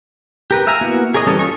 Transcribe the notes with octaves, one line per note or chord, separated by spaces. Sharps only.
G4 A#4 B4
E5 F5 G#5 A#5
A#3 B3 E4 F#4
G#4 A#4 C#5 D#5
E3 G3 C#4 A4 C#5
G3 F4 A4 D#5 C#6